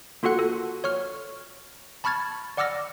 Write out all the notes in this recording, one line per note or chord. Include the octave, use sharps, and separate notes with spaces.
A#3 F4 F#4 A4 F#5 F#6
A4
C#5 C#6 F6
A5 B5 C#6 F6 G#6 A6
D5 F#5 D6 E6 F6 A#6